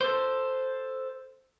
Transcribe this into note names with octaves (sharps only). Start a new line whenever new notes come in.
A4 C5